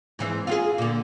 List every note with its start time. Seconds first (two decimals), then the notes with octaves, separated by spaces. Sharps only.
0.19 G#2 E3 C4
0.47 F4 F#4 G#4
0.78 A#2 D3